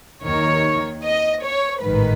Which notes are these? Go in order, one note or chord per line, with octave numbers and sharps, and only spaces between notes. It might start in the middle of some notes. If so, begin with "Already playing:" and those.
D#2 D#3 C#5
D#5
C#5
A1 G#2 D#3 B4